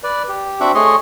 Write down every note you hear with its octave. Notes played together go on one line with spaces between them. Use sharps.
B4 D5
G4
C4 D4 F#4 E5 F#5 D6
A3 G#4 C#5 D#5 C6